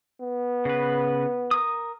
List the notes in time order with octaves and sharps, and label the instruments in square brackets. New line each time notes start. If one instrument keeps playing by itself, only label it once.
[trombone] B3
[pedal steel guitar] C#3 B4
A#4 D#6